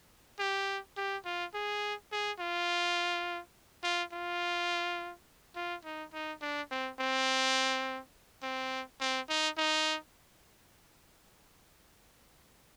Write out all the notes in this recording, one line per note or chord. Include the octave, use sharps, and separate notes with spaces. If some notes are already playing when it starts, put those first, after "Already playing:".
G4
G4
F4
G#4
G#4
F4
F4
F4
F4
D#4
D#4
D4
C4
C4
C4
C4
D#4
D#4